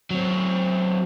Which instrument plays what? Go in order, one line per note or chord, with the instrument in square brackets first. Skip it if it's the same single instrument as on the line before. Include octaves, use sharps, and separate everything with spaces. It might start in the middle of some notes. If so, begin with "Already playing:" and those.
[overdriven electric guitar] F#3 C4